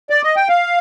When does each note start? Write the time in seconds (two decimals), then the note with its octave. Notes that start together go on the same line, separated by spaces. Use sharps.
0.10 D5
0.23 D#5
0.36 G5
0.49 F5